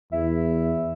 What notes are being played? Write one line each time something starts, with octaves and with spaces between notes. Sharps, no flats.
E2 E4